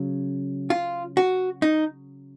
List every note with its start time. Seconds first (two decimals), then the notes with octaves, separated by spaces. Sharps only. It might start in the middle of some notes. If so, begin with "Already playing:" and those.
Already playing: C#3 F#3
0.70 F4
1.17 F#4
1.62 D#4